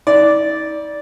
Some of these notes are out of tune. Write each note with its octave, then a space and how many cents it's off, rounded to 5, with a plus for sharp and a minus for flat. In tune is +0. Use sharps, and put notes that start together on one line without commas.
D#4 +45 D5 -5